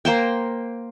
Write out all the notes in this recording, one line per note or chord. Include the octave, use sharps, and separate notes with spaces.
A#3 C5 G5